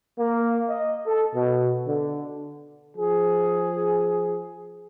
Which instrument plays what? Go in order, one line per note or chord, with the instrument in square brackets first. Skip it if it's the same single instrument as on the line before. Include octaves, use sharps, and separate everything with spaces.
[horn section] A#3
D#5
A4
B2
D3
[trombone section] F3 G#4